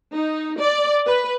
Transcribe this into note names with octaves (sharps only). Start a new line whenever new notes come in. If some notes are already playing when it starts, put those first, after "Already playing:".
D#4
D5
B4